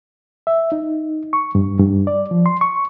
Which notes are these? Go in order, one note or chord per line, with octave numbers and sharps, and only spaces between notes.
E5
D#4
C#6
G2
G2
D5
F3
C6
C#6